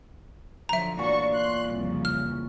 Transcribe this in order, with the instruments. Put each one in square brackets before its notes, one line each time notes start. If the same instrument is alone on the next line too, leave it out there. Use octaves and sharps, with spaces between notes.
[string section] D3 F3 F#3 [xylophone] E5 A#5
[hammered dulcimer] A#2 E3 C#5 [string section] D4 F#4 C#6
[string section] C6 F#6
C2 F2 C#3
[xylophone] F6